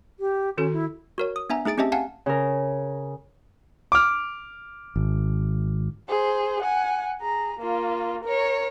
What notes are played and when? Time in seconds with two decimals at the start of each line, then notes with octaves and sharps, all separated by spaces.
0.20 G4
0.58 D#3 C#4 F#4 A4
0.73 E4
1.18 F#4 A#4 C#5
1.36 D#6
1.50 B3 D4 E5 G#5 A#5
1.65 A3 D#4 G#4 A6 D7
1.78 C4 C#4 G4 D#5 E5 A5
1.92 F5 F#5 G#5 A5
2.26 C#3 A#4
3.92 D6 F6
4.96 G#1
6.09 G#4 C5
6.62 F#5 G#5
7.20 G#4 A#5
7.59 A#3 F4
8.24 A#4 C#5